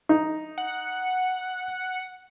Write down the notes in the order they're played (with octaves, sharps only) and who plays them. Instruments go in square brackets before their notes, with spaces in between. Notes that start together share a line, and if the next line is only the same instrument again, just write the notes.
[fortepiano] D#4
[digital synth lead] F#5